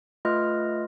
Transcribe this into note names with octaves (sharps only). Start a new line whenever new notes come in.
A3 F4 B4 D#5 F6